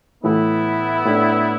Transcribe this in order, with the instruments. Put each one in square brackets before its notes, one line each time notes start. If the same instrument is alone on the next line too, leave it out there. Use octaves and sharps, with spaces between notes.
[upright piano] A2 E3 A3 [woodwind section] B3 E4
[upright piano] A2 A3 D4